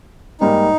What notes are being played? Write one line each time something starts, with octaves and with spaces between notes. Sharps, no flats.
G#2 G3 A#3 D#4